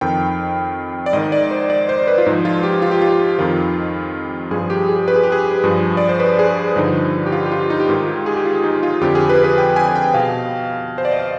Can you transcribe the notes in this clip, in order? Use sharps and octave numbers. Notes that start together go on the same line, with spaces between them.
F2 D#3 G5
D5
G#2 D#3 D#5
D5
C5
D5
C5
B4
F4
G#2 F3 D#4
F4
G4
F4
G4
F4
F2 D#3 F4
G2 F3 G#4
G4
G#4
B4
G#4
G4
G#4
G2 F3
D5
C5
B4
G#4
G2 D3 F3 D#4
G4
F4
G4
F4
D#4
G4
G#2 D#3 F4
G4
G#4
G4
F4
D#4
F4
F2 D3 F3 G4
G#4
B4
B4
G5
G#5
G#5
G5
B2 F5
C5
D5
D#5
F5